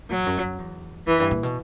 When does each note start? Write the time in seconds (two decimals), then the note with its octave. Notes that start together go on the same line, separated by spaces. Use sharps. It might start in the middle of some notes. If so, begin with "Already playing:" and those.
0.10 A#2 F#3
0.18 E2
0.26 F#2
0.42 F#2
0.58 E2
1.07 F#2 E3
1.20 G2
1.31 A#2
1.43 B2